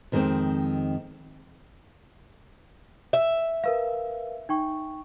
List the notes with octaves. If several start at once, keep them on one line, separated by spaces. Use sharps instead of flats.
F2 D#3 G#3 B3 C4
E5
A#4 B4 F5
D#4 G5 C#6